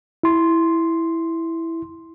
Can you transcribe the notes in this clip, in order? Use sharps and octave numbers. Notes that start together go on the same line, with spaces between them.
E4 C6